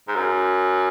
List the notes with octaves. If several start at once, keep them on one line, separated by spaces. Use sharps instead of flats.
G#2
F#2